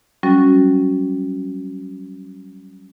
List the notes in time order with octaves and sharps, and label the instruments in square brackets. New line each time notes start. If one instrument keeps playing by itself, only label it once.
[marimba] F#3 G3 C#4 F#4